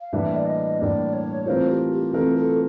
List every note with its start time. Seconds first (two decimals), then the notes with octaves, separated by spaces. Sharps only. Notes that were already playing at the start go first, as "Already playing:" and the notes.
0.01 F5
0.13 A2 E3 G3 A#3 D4 E5
0.36 D5
0.46 D#5
0.79 A2 E3 G3 A#3 D4 D5
1.13 C#5
1.46 E3 A3 C4 F4 A#4 C5
1.70 G4
1.92 G4
2.13 E3 A3 C4 F4 A4 A#4
2.36 A4